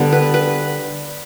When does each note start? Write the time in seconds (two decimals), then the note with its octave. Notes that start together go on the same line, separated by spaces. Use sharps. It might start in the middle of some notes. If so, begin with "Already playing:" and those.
Already playing: D3 G3 B3
0.13 B4
0.34 B4